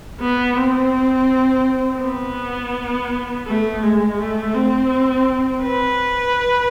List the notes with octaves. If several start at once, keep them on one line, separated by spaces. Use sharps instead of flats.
B3
C4
B3
A3
G#3
A3
C4
B4